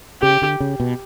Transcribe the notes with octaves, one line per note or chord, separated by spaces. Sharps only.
C#3 G4
D3
C#3
B2